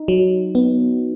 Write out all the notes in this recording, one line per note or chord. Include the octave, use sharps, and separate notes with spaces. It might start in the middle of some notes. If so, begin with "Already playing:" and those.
Already playing: D#4
F#3
B3